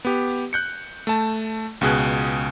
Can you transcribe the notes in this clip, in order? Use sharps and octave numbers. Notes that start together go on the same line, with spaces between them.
B3 G4
F#6 G6 C#7
A3 A5
C#2 B2 G#4 F#6